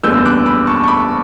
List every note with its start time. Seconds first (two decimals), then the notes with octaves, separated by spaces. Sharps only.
0.03 F#1 E2 D3 G3 B3 E6 G6
0.26 D6 F#6
0.46 B5 D6
0.67 A5 C#6
0.84 C#6
0.88 B5 D6